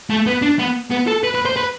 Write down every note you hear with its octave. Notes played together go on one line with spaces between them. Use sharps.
A3
B3
D4
B3
B3
A4
B4
B4
C5
B4